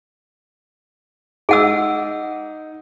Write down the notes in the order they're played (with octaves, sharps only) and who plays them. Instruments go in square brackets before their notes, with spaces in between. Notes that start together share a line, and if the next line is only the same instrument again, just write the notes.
[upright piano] D#4 [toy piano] G#4 F#5 E6